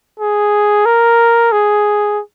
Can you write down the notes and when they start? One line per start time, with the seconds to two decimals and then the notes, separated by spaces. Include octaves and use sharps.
0.20 G#4
0.86 A#4
1.52 G#4